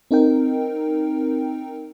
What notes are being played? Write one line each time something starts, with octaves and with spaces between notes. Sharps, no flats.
C4 D#4 A#4 G5